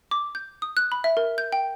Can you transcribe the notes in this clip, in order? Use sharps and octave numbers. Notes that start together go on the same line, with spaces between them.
D6
G6
D#6
F#6
B5
E5
A#4
G6
G5